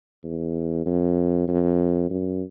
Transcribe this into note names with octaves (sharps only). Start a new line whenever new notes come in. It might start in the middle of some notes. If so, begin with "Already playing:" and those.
E2
F2
F2
F#2